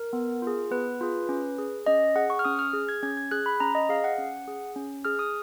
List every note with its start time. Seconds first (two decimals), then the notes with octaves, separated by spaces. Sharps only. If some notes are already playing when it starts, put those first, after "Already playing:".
Already playing: A#4
0.13 B3
0.42 F4 G#4
0.71 B3 B4
1.01 F4 G#4
1.29 C#4
1.58 G#4
1.86 C#4 D#5
2.15 G#4 F#5
2.30 C#6
2.39 F6
2.45 C#4 D#6
2.59 F6
2.73 G#4
2.89 G#6
3.03 C#4 G#6
3.17 G#6
3.31 G#4 F#6
3.46 B5
3.60 C#4 A#5
3.75 D#5
3.89 G#4 F5
4.04 F#5
4.18 C#4
4.48 G#4
4.76 C#4
5.05 G#4 F6
5.19 D#6